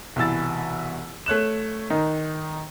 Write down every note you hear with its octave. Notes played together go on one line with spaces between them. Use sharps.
C2 B2 E3 E6 A6
A3 C#5 F#6 E7
D#3 D#4